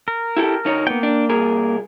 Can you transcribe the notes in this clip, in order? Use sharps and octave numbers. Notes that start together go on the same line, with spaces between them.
A#4
E4 G4 A4
D2 D#4 C#5
A#3 B3 G5
D4
C2 G#4 A#4